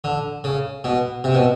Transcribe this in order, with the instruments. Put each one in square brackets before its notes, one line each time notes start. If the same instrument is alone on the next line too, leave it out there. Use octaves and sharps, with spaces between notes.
[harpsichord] D3
C#3
B2
C3
B2